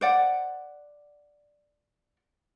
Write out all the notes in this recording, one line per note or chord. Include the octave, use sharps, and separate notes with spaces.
C5 D5 F#5